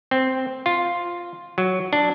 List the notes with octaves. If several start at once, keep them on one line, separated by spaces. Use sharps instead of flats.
C4
F4
F#3
D4